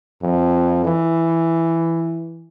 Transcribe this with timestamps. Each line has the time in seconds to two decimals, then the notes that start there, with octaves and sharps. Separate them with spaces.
0.22 F2
0.85 E3